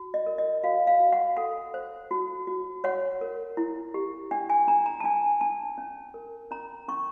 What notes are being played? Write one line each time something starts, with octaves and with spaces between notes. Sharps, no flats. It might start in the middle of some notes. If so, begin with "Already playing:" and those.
Already playing: F#4
D#5
A#4
D#5
F#4 F5
F5
F#4
F#5
A4 F#5
C5
F#4
F#4
C#5 F#5
A#4
E4
G4
D4 G5
G#5
D4 A#5
A#5
A5
D4 G#5
D4 A5
C#4
A#4
C#4 A#5
C#4 C#6